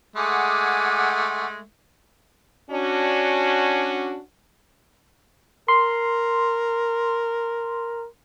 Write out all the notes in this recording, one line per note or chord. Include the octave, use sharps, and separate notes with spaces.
G#3 A3 F#5 G#5 D6
C#4 D4 F#4
A#4 C6